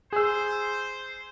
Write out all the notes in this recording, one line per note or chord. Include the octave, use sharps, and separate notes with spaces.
G#4 C5 E6